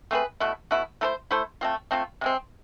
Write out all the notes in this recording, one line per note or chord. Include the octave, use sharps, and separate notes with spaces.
A3 C4 G#4 B4
B2 A3 E4
B2 A3 E4
A3 E4 A4 C5
A3 E4 A4 C5
A3 C4 F4
A3 C4 F4
C3 G#3 C4